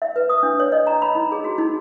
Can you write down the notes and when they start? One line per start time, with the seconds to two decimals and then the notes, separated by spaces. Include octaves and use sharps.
0.02 E5
0.16 B4
0.29 D#6
0.43 D4
0.60 C#5
0.72 D#5
0.87 A#5
1.02 B5
1.15 D#4
1.32 G#4
1.44 F#4
1.58 D#4